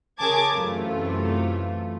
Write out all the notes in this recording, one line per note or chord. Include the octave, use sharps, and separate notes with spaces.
C#3 G#4 A#4 A5 D6 G#6
F#2 C3 E3 A3 F4